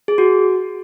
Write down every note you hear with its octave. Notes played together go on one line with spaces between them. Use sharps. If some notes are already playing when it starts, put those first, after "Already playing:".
G#4
F#4